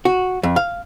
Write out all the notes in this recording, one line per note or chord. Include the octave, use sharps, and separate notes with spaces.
F#4
F2
F5